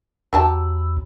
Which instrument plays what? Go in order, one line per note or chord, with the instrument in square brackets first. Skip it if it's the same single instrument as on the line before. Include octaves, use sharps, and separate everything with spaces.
[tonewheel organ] E2 [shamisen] F#3 G4 A5